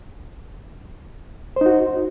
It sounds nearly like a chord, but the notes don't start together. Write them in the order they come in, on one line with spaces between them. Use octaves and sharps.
C5 D#4 F#4